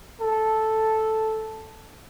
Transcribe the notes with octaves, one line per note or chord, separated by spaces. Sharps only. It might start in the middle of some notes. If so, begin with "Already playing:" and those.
A4